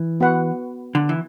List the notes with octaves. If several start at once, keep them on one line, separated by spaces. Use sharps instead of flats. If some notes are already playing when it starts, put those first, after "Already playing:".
Already playing: E3
B3 F#4 B4 F#5
D3
E3